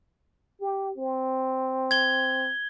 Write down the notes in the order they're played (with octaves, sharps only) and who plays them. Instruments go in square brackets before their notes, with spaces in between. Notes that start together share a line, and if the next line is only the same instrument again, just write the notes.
[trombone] G4
C4
[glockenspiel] G#6 G7